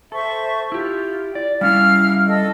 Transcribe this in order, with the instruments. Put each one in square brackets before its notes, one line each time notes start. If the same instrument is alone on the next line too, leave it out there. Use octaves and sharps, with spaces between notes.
[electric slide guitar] A4 [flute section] C5 E5 C#6
[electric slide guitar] E4 G4 [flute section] F4
[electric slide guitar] D5
[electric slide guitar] G3 C#4 E4 [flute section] F5 F6
[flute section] A4 D#5 E6